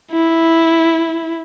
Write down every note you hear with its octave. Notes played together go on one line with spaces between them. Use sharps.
E4